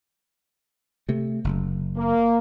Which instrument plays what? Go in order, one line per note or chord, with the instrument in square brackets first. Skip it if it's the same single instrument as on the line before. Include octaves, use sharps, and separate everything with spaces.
[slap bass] C3 A3
F#1
[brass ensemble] A#3